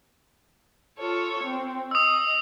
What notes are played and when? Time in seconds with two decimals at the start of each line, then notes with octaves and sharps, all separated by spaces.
0.98 F4 A4 C#5
1.43 C4
1.91 D#5 D#6 E6